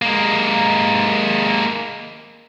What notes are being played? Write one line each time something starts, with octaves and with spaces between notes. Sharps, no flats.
G#3 A#3